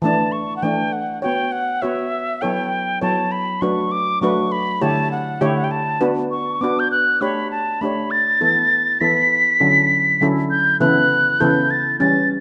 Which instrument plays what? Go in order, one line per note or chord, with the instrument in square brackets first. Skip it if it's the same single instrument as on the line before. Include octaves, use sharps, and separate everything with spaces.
[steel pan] E3 A3 D4 [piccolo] A5
[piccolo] C#6
F#5
[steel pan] E3 A3 D4 [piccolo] G5
[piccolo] F#5
[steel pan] B3 F#4 C#5 [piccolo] G5
[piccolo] F#5
[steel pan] B3 F#4 C#5 [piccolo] E5
[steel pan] F#3 B3 E4 A4 C#5 [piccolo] G5
[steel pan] F#3 B3 E4 A4 C#5 [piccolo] A5
[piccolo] B5
[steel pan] F#3 A3 D4 F#4 B4 [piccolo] C#6
[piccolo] D6
[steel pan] F#3 A3 D4 F#4 B4 [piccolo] C#6
[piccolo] B5
[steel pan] D3 A3 E4 G4 C#5 [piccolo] A5
[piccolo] F#5
[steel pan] D3 A3 E4 G4 C#5 [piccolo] G5
[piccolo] F#5
G5
A5
[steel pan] B3 D4 F#4 B4
[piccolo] C#6
[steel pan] B3 D4 F#4 B4 [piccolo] D6
[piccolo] G6
F#6
[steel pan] A3 D4 G4 C#5 [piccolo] B5
[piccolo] A5
[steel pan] A3 D4 G4 C#5 [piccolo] B5
[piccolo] A6
[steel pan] E3 B3 E4 A4
[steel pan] E3 B3 E4 A4 [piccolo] B6
[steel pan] D3 F#3 C#4 E4 A4
D3 F#3 C#4 E4 A4
[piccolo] G6
[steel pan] C#3 E3 B3 E4 A4 [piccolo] F#6
[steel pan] C#3 E3 B3 E4 A4 [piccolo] G6
[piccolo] A6
[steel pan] E3 G3 C#4 [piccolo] A6